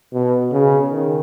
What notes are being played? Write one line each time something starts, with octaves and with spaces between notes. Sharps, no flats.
B2
C#3
D#3